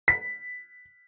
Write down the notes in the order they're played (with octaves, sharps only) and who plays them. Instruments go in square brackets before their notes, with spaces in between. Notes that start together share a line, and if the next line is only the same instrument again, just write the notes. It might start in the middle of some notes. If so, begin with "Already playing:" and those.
[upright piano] B6